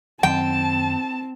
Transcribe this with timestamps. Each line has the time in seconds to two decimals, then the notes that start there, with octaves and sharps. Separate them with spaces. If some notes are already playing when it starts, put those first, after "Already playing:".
0.23 F#2 D#3 F#3 C4 G5 A5